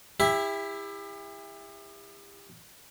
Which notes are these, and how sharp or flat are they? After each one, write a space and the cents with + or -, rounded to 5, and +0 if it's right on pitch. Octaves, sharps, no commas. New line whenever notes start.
E4 +0 G4 +40 E5 +0